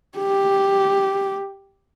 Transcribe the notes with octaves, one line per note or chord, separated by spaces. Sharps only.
G4